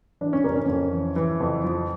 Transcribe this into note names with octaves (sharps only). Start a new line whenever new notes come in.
E3 D4
C#4
F2 A#3
C#4
F2
E3
E3
F2
F3